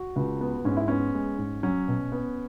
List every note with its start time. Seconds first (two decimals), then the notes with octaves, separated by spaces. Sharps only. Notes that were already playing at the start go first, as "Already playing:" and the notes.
Already playing: F#4
0.16 C#2
0.41 B3
0.65 G#2 C#4
0.77 E4
0.88 B3 C#4
1.15 G#3
1.38 G#2
1.63 F#3 C#4
1.88 B2
2.12 B3